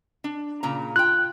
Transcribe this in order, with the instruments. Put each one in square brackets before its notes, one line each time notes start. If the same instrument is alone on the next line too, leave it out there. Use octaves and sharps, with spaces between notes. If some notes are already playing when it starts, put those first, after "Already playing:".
[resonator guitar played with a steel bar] D4
A#2 C#3 A#5
[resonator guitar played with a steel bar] F4 G5 [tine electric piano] F#6